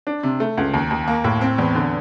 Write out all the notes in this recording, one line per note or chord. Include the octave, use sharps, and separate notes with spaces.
D4
C3
A3
C#2
D#2
D#2
A#3
A2
C4
E2
D3